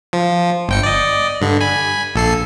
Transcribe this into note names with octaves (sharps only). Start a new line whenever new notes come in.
F3
G1 G5 C#7
D5 D#5
G2 D3
G#5 B5
A#1 A4 C7